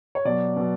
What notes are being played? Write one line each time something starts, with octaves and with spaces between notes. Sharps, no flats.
C#5
B2 F#3 D5
B2 F#3